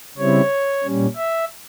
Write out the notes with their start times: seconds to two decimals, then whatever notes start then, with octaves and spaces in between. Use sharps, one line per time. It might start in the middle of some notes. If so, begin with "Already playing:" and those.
0.18 C#3 G3 C4 E4 C#5
0.83 A#2 G3 C#4
1.16 E5